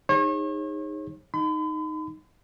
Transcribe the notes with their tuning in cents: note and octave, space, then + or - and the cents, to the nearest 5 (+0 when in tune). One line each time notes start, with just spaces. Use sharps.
D#4 +0 G#4 -30 C#5 -40
D#4 +0 B5 +45